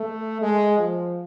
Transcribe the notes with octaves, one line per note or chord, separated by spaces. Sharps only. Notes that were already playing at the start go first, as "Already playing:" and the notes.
Already playing: A3
G#3
F3